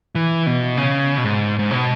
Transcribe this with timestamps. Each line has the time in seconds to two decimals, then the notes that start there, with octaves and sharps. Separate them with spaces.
0.15 E3
0.46 B2
0.77 C#3
1.18 B2
1.24 G#2
1.59 G#2
1.71 B2